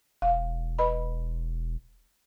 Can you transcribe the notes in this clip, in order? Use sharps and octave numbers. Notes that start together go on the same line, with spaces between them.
E1 F5
B4 D#5 B5